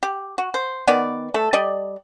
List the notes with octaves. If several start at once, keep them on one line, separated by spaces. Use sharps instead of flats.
G4
F#4
C5
D#3 B3 D5
A3 A4
G3 D5 D#5